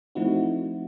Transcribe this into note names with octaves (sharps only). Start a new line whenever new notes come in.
F3 A3 C4 D#4 E4 F#4